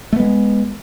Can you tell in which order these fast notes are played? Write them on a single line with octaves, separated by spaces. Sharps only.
A3 B3 G#3